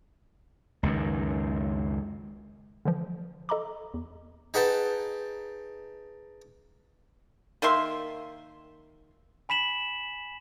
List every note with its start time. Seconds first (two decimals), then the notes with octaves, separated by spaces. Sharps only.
0.83 C#2 F#2 D#3
2.85 D3 E3 F3
3.49 A4 D#5 A#5 B5 D6
3.94 E2
4.54 D#4 G#4 B4 F#5 G5 A5
7.62 D#3 A#3 E5 C6
9.49 G#5 B5 B6 E7 F#7